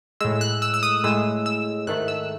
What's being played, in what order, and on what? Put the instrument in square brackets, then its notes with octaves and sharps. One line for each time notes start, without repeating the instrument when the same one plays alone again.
[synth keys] A2 G#3 E6
F#6
E6
E6
D#6
A2 G#3 E6
E6
G#2 D#3 A3 F#6
E6